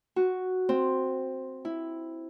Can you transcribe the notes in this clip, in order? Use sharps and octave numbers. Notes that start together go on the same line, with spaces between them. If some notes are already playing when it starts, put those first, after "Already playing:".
F#4
C4
E4